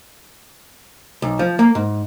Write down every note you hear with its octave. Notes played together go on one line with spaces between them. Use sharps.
B1
F3
A#3
G#2